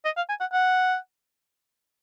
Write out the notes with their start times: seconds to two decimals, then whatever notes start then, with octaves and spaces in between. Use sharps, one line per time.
0.05 D#5
0.17 F5
0.29 G#5
0.40 F#5
0.52 F#5